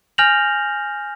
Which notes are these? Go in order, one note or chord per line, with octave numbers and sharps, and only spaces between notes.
G#5 F6 G6 A#6 F7 F#7